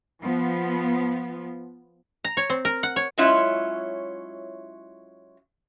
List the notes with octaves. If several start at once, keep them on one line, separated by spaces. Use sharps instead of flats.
F3 B3
A#5
C#5
C4
A#4
F#5
C#5
F#3 G#3 C#4 E4 F4